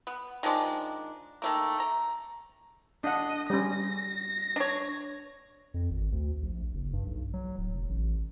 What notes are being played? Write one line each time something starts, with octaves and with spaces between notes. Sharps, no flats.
B3
D#3 F3 G#3 D4
D#3 A3 A#3
A#5
D4 D#5 F#5
G3 C#4 A#6
D4 C#5
F2
G#1
D2
A#1
F#1
G2
B1
F#3
D1
F1
A1